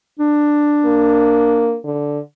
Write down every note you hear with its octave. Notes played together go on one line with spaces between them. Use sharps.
D4
A#3
D3